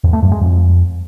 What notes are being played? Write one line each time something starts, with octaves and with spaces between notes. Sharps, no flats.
E2
A3
F#2
G#3
F2